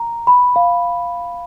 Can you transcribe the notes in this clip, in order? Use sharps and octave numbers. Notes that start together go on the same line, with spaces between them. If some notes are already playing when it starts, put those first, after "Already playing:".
Already playing: A#5
B5
F5